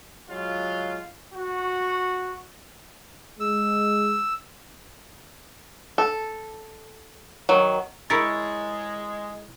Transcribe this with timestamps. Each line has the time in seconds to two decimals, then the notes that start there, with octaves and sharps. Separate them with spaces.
0.30 F#3 G#3 F4
1.33 F#4
3.40 G#3 E6
5.98 A4
7.49 D#3 F#3
8.10 G#3 E4 A#4 C#5 A6